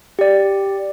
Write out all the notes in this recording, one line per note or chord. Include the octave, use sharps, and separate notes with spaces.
G4 D5